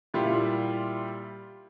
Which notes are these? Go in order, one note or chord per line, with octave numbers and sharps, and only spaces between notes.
A#2 G3 E4 F4 G4